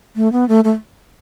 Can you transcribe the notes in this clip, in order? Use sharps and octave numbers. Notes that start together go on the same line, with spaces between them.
A3
B3
A3
A3